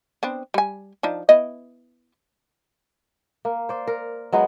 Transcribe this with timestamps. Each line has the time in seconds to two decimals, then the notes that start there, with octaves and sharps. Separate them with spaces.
0.23 B3 C4 D4
0.54 G3 G#5
1.03 F3 D4 D#4
1.29 B3 E4 D#5
3.45 A#3
3.69 C5 D5
3.87 A#4
4.32 F#3 G#3 B3 D#4